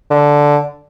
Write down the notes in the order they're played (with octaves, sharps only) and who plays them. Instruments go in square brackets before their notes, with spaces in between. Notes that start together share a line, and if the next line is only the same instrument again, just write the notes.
[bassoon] D3